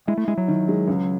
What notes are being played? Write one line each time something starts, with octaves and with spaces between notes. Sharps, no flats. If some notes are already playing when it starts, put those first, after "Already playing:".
G#3 E4
A3
G#3 E4
F#3
D#3
G#3
C#2